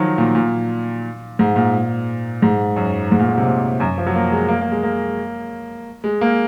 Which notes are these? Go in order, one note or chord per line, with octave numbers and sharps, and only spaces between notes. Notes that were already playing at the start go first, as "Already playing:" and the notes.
Already playing: D#3 F3 F#3
A#2
A#2
G#2
A#2
G#2
F#2
G#2
A#2
G#2
C3
A#2
F#2
F3
F#3
A#3
G#3
A#3
A#3
G#3
A#3
G#3
A#3